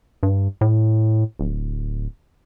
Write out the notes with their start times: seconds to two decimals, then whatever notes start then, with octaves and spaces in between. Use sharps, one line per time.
0.23 G2
0.61 A2
1.39 D1